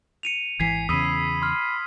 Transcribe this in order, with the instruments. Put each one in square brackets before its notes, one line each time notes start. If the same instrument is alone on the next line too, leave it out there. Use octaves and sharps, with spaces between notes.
[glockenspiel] C#7 D#7 F7
[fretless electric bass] G#1 E3 [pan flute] G#5 [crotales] G#6 B6 C7
[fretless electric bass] E2 C#3 [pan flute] B5 [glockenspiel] D#6 [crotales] E6 B6 D#7
[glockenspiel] C6 F6